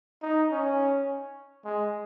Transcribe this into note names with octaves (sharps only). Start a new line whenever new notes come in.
D#4
C#4
G#3